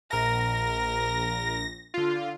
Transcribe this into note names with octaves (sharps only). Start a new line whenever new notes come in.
A#1 A#4 A#6
D3 F4